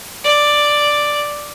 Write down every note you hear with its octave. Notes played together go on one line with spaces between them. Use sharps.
D5